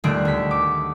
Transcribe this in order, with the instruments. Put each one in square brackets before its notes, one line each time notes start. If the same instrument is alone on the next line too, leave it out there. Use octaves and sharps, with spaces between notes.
[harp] D#1 D3 G3 A3 F#6 D7
D2 B6
D6